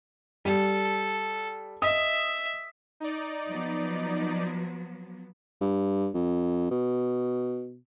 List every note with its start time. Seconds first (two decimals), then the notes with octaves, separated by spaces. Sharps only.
0.45 G3 A4
1.82 D#5 E5 D#6
3.00 D#4 D5
3.49 F3 F#3 B3
5.61 G2
6.14 F2
6.71 B2